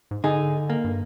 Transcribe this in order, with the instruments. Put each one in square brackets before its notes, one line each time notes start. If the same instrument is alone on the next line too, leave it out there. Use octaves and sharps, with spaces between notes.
[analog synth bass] G#2
[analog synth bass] D3 [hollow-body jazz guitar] D#4 G#4
[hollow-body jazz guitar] A#3
[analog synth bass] G2